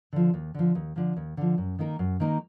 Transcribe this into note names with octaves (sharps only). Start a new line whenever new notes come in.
D3 F3
D#2
D3 F3
D#2
D3 F3
D#2
D3 F3
F#2
D#3 A#3 D#4 A#4
F#2
D#3 A#3 D#4 A#4